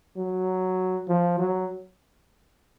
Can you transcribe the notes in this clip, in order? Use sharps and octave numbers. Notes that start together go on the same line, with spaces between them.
F#3
F3
F#3